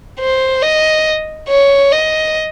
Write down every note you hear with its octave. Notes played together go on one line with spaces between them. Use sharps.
C5
D#5
C#5
D#5